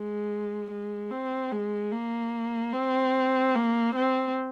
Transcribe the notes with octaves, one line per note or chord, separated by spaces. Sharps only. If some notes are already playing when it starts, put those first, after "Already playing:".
Already playing: G#3
G#3
C4
G#3
A#3
C4
A#3
C4